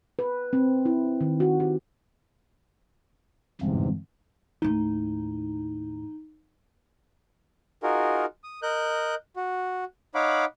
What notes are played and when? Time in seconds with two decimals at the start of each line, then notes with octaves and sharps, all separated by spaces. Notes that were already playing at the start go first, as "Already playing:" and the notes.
0.19 B4
0.53 C4
0.85 E4
1.21 D#3
1.40 F#4
1.60 G4
3.61 G1 E2 G#2 C3
4.62 D#2 A2 D#4
7.82 D#4 F4 F#4 G#4 A#4
8.44 D#6
8.63 A#4 D#5 F#6 G6
9.36 F#4
10.15 D#4 C#5 F5 F#5 B5 D6